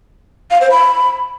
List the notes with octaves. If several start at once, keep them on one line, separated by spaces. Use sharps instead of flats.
F5
C5
B5